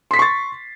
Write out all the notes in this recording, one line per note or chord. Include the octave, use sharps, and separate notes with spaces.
C6 C#6 A6 B6 C7